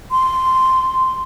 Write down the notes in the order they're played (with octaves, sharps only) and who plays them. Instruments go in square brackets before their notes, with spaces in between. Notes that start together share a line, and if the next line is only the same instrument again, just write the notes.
[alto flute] C6